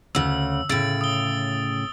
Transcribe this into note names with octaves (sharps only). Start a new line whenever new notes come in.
D2 C#3 E6
A2 C#3 E6 A6 D7
D#6 G7